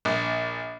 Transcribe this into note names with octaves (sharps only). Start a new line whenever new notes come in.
A#1